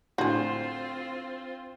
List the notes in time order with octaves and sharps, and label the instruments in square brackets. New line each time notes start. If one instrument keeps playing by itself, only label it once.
[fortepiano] A2 D3 [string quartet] C4 F4 [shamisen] F#4 G#4 [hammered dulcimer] C5